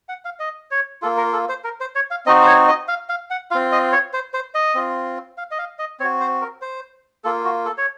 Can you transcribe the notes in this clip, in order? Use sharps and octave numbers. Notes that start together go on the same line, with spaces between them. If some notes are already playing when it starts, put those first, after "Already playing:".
F#5
F5
D#5
C#5
A#3 F4 A4
A#4
A4
C5
A#4
C5
C#5
F5
C4 D#4 F#4 D#5
C5
C#5
D#5
F5
F5
F#5
C4 F4 F5
D#5
C#5
C5
C5
D#5
C4 F4
F5
D#5
F5
D#5
C4 F#4 C#5
C5
A#4
C5
A#3 F4 A4
F#4
A4
C#5